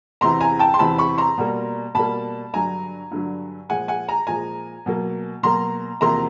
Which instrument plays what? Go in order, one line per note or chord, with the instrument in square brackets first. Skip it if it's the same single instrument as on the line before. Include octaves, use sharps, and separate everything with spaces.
[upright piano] E2 C3 E3 A#5 C6
G#5 A#5
G5 A5
C6
E2 C3 E3 A5 B5
B5 C#6
A#5 C6
B2 G3 A#3
B2 G3 A#3 A5 B5
G2 D3 F#3 G#5 A#5
G2 D3 F#3
A#2 F3 G#3 F#5 G#5
F#5 G#5
G#5 A#5
A#2 F3 G#3 G#5 A#5
B2 F#3 A#3
B2 F#3 A#3 A#5 C6
E2 C3 F3 A#3 A#5 C6